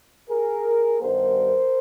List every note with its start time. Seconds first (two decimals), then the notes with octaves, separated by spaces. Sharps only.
0.29 G#4 A#4
1.00 G2 D#3 G3 B3 A#4 C5